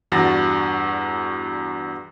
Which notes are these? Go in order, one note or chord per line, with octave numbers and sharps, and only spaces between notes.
E2 G2 D4 F#4 A6 A#6